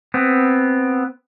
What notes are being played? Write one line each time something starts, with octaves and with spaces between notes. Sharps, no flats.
B3 C4